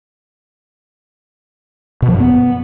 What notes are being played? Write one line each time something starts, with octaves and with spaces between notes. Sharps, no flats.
B2
F3
F#2
B3